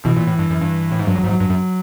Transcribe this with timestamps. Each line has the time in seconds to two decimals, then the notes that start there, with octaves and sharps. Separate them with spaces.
0.05 B2 E3
0.16 A#2
0.27 A2
0.39 G2
0.50 F#2
0.61 G2
0.92 A2
0.99 G#2
1.07 G2 F#3
1.18 F#3
1.24 G#2
1.29 F#3
1.40 G2
1.50 F#2